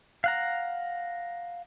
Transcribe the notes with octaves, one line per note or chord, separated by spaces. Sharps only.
F5 F#5 A#5